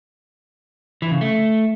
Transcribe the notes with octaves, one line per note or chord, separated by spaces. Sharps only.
E3
C#3
A3